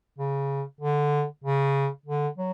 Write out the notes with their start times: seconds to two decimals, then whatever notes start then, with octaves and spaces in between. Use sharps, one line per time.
0.18 C#3
0.80 D3
1.44 C#3
2.06 D3
2.37 F#3